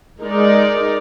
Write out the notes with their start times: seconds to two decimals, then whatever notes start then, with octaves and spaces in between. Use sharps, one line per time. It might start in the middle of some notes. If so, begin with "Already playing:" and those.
0.21 G#3 D#4 A#4 D5